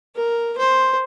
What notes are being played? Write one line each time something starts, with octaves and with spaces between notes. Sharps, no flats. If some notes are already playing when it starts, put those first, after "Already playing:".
A#4
C5